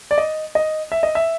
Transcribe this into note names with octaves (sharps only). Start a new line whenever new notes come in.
D5
D#5
D#5
E5
D#5
E5